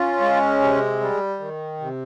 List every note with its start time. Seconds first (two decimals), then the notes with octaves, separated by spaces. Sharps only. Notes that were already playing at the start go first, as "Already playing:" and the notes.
Already playing: C#4 F4
0.20 G#3
0.60 C3
1.00 G3
1.40 D#3
1.80 C3